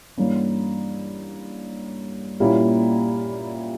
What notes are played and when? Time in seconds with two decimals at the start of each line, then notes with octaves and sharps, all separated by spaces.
0.17 G2 E3 A#3 C#4
2.40 A#2 G3 A#3 C#4 E4